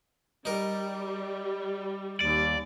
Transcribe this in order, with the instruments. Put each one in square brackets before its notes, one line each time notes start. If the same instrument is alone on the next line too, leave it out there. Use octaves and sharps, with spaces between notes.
[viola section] G3 [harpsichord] D#4 A#4
[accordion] D#2 [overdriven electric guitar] D5